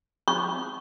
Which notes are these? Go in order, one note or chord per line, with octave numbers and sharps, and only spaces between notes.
C#6